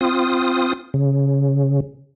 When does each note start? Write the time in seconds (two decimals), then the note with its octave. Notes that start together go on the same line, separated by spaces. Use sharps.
0.01 C4 F4 D#6
0.94 C#3